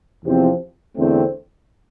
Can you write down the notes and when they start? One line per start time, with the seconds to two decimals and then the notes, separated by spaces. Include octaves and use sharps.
0.25 E2 C3 F3 C4
0.97 E2 D3 A3 C4